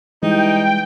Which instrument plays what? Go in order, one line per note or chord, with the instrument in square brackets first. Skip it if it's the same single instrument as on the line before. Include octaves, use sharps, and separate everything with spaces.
[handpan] E3 G3 [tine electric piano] G#3 [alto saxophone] D#4 [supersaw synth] G5